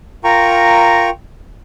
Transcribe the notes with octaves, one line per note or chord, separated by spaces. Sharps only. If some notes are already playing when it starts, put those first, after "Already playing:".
F4 A#4 G5 A#5 C#6